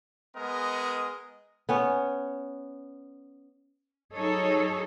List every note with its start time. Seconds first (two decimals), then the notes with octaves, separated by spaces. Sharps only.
0.36 G#3 B3 A#4 D#5
1.69 B3 C#4 C#5
4.13 F#3 D#4 G#4 A4 C#5 D#5